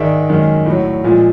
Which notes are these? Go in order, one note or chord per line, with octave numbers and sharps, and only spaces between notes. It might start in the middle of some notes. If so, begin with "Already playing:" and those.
Already playing: G#2 D#3 G#3 D5 E5
F#2 D#3 G#3
A2 F#3
A#2 F3 G#3